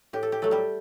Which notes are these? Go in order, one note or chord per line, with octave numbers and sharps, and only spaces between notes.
A2 G4
A4
G4
F#3 A3 A4
G3 G4